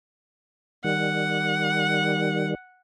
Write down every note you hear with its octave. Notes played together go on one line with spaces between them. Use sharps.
D#3 G3 F#5